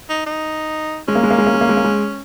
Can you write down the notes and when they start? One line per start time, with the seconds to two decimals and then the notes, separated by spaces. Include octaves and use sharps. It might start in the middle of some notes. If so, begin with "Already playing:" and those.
0.10 D#4
0.26 D#4
1.08 G#3 C#4
1.15 A#3
1.23 G#3
1.31 A#3
1.38 G#3
1.47 A#3
1.54 G#3
1.61 A#3
1.69 G#3
1.77 A#3
1.85 G#3